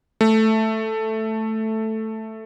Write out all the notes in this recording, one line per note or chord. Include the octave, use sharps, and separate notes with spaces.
A3